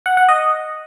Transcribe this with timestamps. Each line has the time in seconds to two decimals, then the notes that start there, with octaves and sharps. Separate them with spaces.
0.06 F#5
0.17 F#5
0.29 D#5